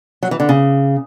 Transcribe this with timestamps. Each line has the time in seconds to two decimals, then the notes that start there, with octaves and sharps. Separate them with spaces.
0.23 F#3
0.31 E3
0.40 D3
0.49 C#3